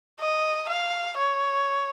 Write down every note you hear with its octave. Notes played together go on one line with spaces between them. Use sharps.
D#5
F5
C#5